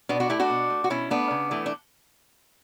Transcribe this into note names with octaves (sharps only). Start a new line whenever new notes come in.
B2 B3 D4
D4 F#4
A3 E4 G4
D4 F#4
B2
A3
F#4
B2 C#4 E4
A3 B3 D4
C#3
E3 A3
D4